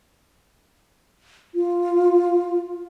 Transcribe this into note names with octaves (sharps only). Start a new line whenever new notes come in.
F4